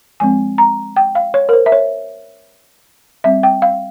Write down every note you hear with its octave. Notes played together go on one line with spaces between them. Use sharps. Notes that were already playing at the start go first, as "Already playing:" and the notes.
F3 G#3 C4 G#5
A#5
G5
F5
C#5
A#4
C5
E5
C#5
G3 C4 E5
G5
F5